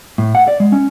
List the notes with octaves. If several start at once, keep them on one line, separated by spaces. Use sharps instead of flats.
A2
F#5
D5
G#3
C#4